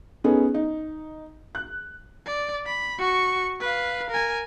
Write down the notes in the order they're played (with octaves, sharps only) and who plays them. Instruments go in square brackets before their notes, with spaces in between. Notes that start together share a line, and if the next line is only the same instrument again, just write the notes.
[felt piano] B3 C#4 D#4 G#4 A4
D#4
F#6
[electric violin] D5
B5
F#4 C#6
B4 F5
A#4 G#5